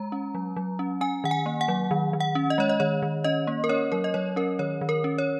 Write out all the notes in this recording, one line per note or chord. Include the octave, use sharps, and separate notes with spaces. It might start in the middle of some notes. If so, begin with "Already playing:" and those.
Already playing: G#3 A#5
C#4
F#3
F#3
C#4
C#4 G#5
D#3 F#5
G#5
A#3
F#5
F#3
D#3
D#3
F#5
C#4
D#5
G#3 C#5
D#5
D#3 C#5
D#3
C#4 D#5
A#3
A#4
C#4 C#5
F#3 A#4
D#5
F#3 C#5
C#4 A#4
D#3 C#5
D#3
A#4
C#4
C#5